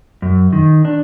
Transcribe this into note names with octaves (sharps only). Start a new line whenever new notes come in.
F#2
D#3
D4